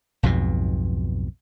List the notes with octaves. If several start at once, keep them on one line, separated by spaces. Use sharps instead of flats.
B1 F2 G#2 B2